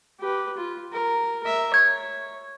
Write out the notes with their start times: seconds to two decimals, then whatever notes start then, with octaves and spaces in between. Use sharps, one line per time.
0.20 G4 B4
0.57 F4
0.93 A#4
1.43 A#4 E5
1.74 C#5 G#6